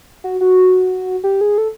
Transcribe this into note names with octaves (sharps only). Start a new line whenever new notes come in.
F#4
F#4
G4
G#4
A4